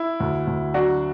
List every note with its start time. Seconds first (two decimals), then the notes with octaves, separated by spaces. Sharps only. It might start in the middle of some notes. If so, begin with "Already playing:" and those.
Already playing: E4
0.20 D2
0.47 D2
0.74 F#3 D4 F#4